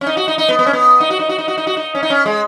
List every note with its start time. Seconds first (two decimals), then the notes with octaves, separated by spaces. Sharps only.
0.01 C#4
0.07 D#4
0.17 F#4
0.28 D#4
0.38 D#4
0.49 B3
0.59 B3
0.66 C#4
0.73 B3
1.00 D#4
1.10 F#4
1.19 D#4
1.29 F#4
1.38 D#4
1.48 F#4
1.58 D#4
1.67 F#4
1.77 D#4
1.95 C#4
2.03 D#4
2.10 C#4
2.26 G#3